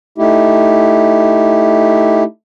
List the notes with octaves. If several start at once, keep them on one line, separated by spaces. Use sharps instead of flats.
A3 D#4 E4 G4